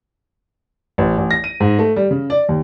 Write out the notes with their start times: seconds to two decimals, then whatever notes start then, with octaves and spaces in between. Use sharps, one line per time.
0.98 A1
1.18 A1
1.31 A#6
1.44 D#7
1.60 G#2
1.79 A3
1.96 G3
2.11 C#3
2.30 D5
2.49 D#2